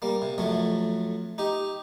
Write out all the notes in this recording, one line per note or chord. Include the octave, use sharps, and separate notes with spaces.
G3 A#3
C3
F2 F#3 A3
D#4 G4